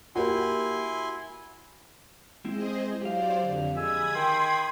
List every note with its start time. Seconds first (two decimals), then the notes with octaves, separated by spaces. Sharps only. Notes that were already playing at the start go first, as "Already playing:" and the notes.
0.16 A#3 E4 F#4 G4 A#4 G#5 C6
2.45 G#3 C4 E4 G#4 C5 D#5
3.02 F#3 G4 C5 D5 F5
3.41 F2 D3
3.76 G#3 G#5 B5 D#6 E6 G#6
4.15 D#3 G5 C6